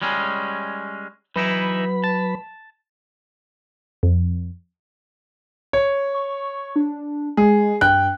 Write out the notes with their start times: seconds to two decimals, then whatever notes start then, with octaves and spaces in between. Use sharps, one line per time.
0.02 G3 G#3 C#4
1.36 E3 F#3 D#4 E4 B4 B5
2.04 A5
4.03 F2
5.73 C#5
6.14 C#6
6.76 D4
7.37 G#3 G#4
7.81 G2 G5 F#6